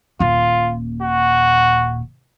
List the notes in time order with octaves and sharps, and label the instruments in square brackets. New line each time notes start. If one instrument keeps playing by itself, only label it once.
[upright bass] D#1 A#2 [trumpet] F4
[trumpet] F#4